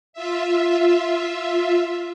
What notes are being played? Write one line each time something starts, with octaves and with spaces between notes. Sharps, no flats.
F4 E5